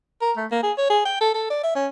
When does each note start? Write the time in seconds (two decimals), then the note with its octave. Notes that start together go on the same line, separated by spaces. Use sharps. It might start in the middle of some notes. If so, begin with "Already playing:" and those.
0.22 A#4
0.37 A3
0.52 A#3
0.63 G#4
0.78 C#5
0.90 G#4
1.05 G5
1.21 A4
1.34 A4
1.50 D5
1.64 E5
1.76 C#4